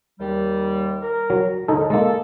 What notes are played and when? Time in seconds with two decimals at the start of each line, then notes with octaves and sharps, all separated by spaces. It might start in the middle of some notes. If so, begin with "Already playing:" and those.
0.19 D#2 G3
1.02 A#4
1.30 F#3
1.68 D#2 G#2 D3 D#4 A4
1.90 G#3 A#3 A4